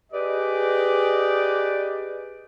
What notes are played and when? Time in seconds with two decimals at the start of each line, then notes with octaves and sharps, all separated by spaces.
0.13 G4 G#4 B4 D5 D#5